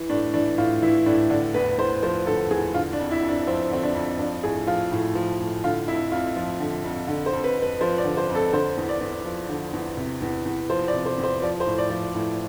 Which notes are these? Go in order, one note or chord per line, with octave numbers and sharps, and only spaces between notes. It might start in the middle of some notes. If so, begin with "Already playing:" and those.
Already playing: E3
A2 D4
E3 D4
A2 F4
E3 E4
A2 D4
D3 D4
E2 B4
E2 C5
F3 C5
D3 A4
E2 G#4
D3 F4
D4
F2
E4
F2
D4
F3 C4
D3 C4
D4
F2
F3 D4
A2 G#4
F3 F4
A2
F3
A2
D3 F4
F2 E4
F2 F4
F3
D3
F2
D3
C5
F2
B4
F2
B4
F3 C5
D5
D3
C5
F2
A4
D3 C5
E2
D5
E2
F3
D3
E2
C3
E2
E2
F3 C5
D5
C3
C5
E2
C5
F3 D5
C5
A2
D5
F3
A2